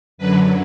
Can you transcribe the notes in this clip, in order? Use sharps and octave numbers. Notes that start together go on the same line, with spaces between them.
F#2 D3 F#3 B4